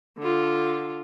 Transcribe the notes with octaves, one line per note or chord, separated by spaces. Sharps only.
D3 F4